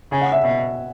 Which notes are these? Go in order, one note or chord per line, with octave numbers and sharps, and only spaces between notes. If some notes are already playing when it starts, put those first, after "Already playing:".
C#3 G#5
F#5
E5
B2 E5